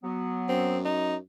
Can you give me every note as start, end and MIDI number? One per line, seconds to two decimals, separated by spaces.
0.04 0.84 54
0.04 0.84 59
0.49 1.17 42
0.49 0.78 60
0.85 1.15 63